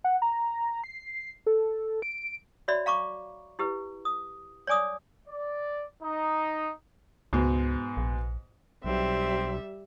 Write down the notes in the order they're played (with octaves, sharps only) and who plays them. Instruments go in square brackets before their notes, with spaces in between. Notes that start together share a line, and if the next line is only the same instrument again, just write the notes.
[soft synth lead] F#5
A#5
C7
A4
D7
[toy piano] F#4 C#5 D5 E5 B5
F5 A#5 C#6 D6
E4 G4 B4
D#6
C#5 D5 G#5 D6 D#6
[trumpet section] D5
D#4
[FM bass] C#2 [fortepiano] G#2 B2
[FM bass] A#1
[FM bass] B1 [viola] G3 E5 [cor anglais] C4